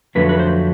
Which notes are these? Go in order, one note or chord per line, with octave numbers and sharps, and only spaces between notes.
F2 D3 F#3 A3 B4
B4
C5